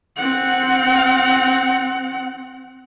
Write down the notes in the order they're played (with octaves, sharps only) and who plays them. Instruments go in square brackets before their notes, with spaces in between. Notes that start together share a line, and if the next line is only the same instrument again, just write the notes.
[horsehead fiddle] C4 F#5